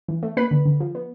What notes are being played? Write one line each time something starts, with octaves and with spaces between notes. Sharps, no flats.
E3
A3
A#3 B4 B5
D3
D3
F3
B3